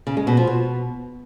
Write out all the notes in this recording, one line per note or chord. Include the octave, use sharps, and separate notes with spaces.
C#3
G#3
B2
F3
B2